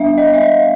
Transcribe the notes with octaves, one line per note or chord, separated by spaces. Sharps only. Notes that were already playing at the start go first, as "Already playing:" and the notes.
Already playing: G3 B3 D4 E5 F5
D#5
E5
D#5